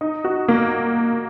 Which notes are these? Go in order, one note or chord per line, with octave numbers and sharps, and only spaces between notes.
D#4
F#4
A#3